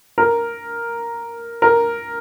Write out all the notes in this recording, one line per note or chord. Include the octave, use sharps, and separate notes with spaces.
A#4
A#4